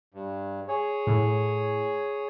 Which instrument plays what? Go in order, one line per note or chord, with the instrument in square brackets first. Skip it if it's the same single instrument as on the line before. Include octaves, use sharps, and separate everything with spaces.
[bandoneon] G2
G#4 C#5
[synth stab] A2